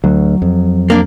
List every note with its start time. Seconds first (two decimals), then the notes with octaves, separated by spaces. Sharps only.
0.04 D2 F#3
0.42 F2
0.90 A#3 D4